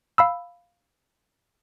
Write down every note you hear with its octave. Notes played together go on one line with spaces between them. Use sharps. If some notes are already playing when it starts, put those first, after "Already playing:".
F5 B5 E6